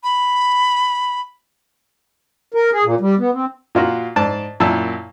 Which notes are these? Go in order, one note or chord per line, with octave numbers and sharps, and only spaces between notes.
B5
A#4
G#4
A#2
G3
B3
C4
A#2 F4 F#4
G#2 D5 A5
F#2 A#2 E4 A5 E6